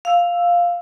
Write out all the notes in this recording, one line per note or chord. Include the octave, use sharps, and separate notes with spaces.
F5 E6